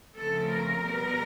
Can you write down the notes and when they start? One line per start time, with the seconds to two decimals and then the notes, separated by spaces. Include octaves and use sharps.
0.16 C#3 F3 A3 C4 A4
0.50 A#4
0.83 B2 G3 B3